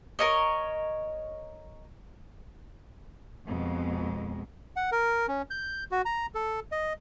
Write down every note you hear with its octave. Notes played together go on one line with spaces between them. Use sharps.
A#4 C#5 D#5
F2 B2 G#3
F#5
A#4
C#4
G6
F#4
A#5
A4
D#5